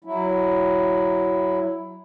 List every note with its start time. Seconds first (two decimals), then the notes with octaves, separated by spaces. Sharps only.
0.04 F#3 E4